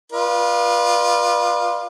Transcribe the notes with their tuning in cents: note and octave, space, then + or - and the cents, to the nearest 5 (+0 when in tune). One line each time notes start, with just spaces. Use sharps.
F4 +0 B4 -30 D5 +35